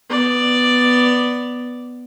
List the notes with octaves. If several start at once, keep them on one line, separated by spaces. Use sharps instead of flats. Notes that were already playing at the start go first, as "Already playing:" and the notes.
B3 D5